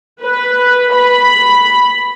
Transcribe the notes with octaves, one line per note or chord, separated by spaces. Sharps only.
B4
B5